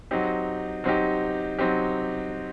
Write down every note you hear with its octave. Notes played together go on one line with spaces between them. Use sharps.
F#3 C4 D#4 G4
F#3 C4 D#4 G4
F#3 C4 D#4 G4